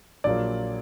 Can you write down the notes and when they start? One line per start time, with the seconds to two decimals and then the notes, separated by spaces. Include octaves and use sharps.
0.24 A#1 A#2 F#3 A#3 D5